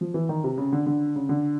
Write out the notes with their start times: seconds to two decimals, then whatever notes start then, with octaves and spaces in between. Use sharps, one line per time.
0.01 F3
0.14 E3
0.29 D#3
0.44 C3
0.58 C#3
0.72 D3
0.86 D3
1.16 C#3
1.29 D3